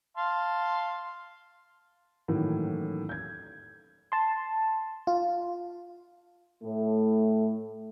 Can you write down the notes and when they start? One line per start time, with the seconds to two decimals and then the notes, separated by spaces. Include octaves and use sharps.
0.17 F5 A5 C6
2.28 A2 D#3 E3 F#3 A#3 C#4
3.09 G6 G#6
4.12 A5 C6
5.07 F4
6.63 A2 A3